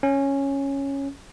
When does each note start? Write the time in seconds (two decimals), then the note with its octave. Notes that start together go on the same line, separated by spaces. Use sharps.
0.03 C#4